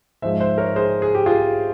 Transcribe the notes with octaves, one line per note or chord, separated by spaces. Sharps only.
G#2 F3 G#3 C5 E5
C5 E5
A#4 C#5
G#4 C5
G#4
G4
F4 G#4